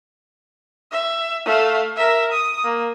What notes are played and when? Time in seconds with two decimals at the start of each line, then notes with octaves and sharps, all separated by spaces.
0.92 E5
1.45 A3 F5
1.96 A#4 E5
2.32 D#6
2.64 A#3